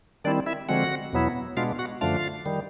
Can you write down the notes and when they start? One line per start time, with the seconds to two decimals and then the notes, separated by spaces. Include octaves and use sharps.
0.24 D#3 G3 C4 D4 E4 D5
0.46 E4 E5
0.69 D3 F3 G#3 C4 F#4 F#5
1.13 E2 B2 F#3 B3 E4
1.57 B2 G#3 B3 D4 F4 F5
1.79 F#4 F#5
2.01 F#2 D3 F3 A3 D4 F4 F5
2.46 D#3 G3